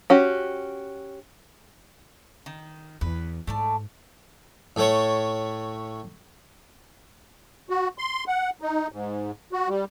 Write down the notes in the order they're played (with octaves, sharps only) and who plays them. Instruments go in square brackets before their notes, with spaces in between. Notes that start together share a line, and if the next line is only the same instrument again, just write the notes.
[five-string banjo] C#4 F#4 G4
[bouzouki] D#3
[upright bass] E2 [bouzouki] B4
[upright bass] G#2 [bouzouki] A3 D5 A5
[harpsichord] A2 A3 C#5
[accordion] F#4
C6
F#5
D#4
G#2
F#4
G3